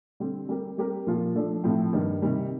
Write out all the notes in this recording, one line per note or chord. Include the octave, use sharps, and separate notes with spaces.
D3 G3 C4
G3 C4 G4 A#4
G3 C4 G4 A#4
A#2 F3 A#3 F4
F3 A3 D4 A4
A2 F3 C4
G2 D#3 G3
C3 D#3 G3